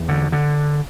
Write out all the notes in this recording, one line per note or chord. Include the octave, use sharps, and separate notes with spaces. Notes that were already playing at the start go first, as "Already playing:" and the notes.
Already playing: E2
D3
D3